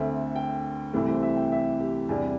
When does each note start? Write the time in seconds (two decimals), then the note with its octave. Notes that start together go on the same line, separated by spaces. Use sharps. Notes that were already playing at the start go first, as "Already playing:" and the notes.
Already playing: D2 D3 C4 E5
0.36 G5
0.94 C2 C3 E3 A3
1.09 C5
1.23 E5
1.37 G5
1.52 E5
1.80 G4
2.09 E2 C3 G3 D4